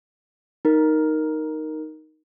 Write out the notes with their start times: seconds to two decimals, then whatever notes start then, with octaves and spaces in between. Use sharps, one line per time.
0.65 D#4 A#4